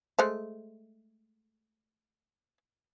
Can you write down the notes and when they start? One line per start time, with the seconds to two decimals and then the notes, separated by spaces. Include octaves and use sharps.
0.19 G#3 A3 C5